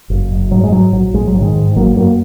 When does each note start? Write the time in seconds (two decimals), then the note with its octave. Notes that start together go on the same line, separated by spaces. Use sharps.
0.10 F#1
0.31 F#2
0.51 G#2 F#3
0.63 G#3
0.72 G#2 F#3
0.93 A#1 F#3
1.14 A#1 G#3
1.27 F#3
1.34 G#2
1.41 D#3 G#3
1.55 G#2
1.76 G#1 F#3 A#3
1.97 F#2 F#3 A#3